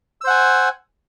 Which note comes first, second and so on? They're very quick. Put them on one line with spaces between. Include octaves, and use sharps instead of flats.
E6 C5 F#5 G#5